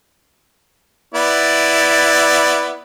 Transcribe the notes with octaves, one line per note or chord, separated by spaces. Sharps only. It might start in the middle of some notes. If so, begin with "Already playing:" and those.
B3 E4 D5